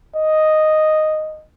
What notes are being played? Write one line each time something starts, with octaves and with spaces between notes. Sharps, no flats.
D#5